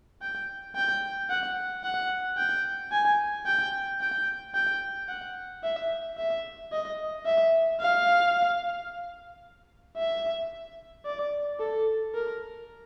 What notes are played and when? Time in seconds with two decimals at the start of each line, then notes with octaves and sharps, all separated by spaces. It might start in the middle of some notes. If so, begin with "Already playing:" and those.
0.22 G5
0.76 G5
1.30 F#5
1.84 F#5
2.38 G5
2.92 G#5
3.46 G5
4.01 G5
4.54 G5
5.09 F#5
5.64 E5
6.18 E5
6.72 D#5
7.26 E5
7.80 F5
9.97 E5
11.05 D5
11.60 A4
12.15 A#4